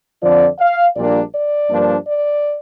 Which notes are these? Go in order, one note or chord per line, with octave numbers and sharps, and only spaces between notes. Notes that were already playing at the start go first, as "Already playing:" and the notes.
F2 D3 F3 C4 D5
F5
A#1 A#2 G3 A#3 D4 D5
D5
G2 F3 A#3 D4
D5